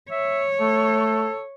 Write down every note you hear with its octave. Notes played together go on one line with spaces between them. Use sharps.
C#5 E5
A3 A4